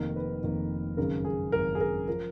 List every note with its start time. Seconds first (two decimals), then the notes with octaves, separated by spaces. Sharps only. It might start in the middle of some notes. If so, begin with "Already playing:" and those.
Already playing: F1 F2 D#3 A#3 A#4
0.16 B4
0.43 F1 F2 D#3 A#3
0.97 G#1 F#2 C#3 A#4
1.25 G#4
1.52 G#1 F#2 C#3 A#4
1.75 G#4
1.81 A#4
2.08 F3 A#4